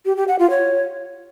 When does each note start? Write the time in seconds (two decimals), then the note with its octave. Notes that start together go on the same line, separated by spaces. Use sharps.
0.06 G4
0.17 G4
0.28 F#5
0.39 F4
0.50 C#5